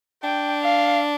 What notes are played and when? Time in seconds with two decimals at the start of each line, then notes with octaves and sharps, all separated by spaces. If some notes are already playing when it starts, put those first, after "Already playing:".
0.23 D4 G5
0.64 F5